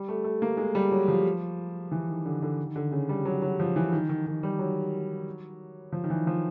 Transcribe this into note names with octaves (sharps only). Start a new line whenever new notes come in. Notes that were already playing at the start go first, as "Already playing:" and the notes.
Already playing: G3
A3
A3
A#3
G#3
G3
F#3
F3
E3
D#3
D3
D3
D#3
D3
C#3
G3
F#3
F#3
F3
E3
D#3
D#3
D#3
G3
F#3
F3
D#3
E3
F3